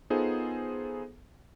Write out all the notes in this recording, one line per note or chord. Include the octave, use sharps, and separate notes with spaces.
B3 D#4 F4 G#4 A4 C5